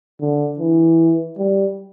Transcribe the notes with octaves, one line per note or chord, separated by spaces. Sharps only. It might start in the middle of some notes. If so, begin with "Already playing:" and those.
D3
E3
G3